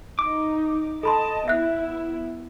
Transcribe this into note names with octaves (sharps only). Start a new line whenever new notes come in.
D#4 D6
A4 D#5 A5 B5 C6
B3 E4 E5 F#6